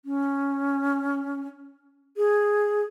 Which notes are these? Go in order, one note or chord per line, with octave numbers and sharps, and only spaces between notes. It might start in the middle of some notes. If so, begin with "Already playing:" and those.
C#4
G#4